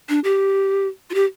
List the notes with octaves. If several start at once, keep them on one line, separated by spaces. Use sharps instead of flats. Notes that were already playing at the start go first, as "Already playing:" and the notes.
D4
G4
F4
G4